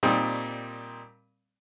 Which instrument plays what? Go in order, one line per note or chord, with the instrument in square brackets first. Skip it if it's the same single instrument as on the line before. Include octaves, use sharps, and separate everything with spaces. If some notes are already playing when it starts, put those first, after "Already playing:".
[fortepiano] A#2 G3 C4 D#4